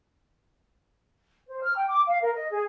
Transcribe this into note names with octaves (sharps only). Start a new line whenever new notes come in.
C5
F6
G5
D6
F5
A#4
D#5
G#4